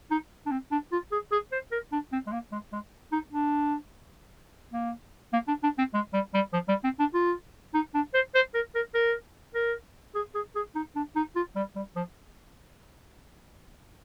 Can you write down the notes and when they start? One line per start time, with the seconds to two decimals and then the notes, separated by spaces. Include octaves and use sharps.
0.11 D#4
0.46 D4
0.51 C4
0.71 D4
0.92 F4
1.12 G#4
1.32 G#4
1.52 C5
1.72 A#4
1.92 D4
2.12 C4
2.27 G#3
2.32 A#3
2.52 G#3
2.73 G#3
3.12 D#4
3.32 D4
4.73 A#3
5.33 A#3
5.48 D4
5.63 D4
5.78 C4
5.94 G#3
6.13 G3
6.34 G3
6.53 F3
6.69 G3
6.84 C4
7.00 D4
7.14 F4
7.74 D#4
7.94 D4
8.14 C5
8.35 C5
8.54 A#4
8.75 A#4
8.95 A#4
9.54 A#4
10.15 G#4
10.35 G#4
10.55 G#4
10.75 D#4
10.96 D4
11.16 D#4
11.36 F4
11.56 G3
11.76 G3
11.96 F3